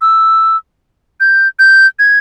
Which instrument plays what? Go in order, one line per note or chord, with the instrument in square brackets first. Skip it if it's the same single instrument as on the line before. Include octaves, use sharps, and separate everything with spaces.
[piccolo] E6
G6
G6
G#6